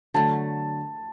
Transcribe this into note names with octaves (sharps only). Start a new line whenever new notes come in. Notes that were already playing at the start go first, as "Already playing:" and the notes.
D3 F#3 A3 A5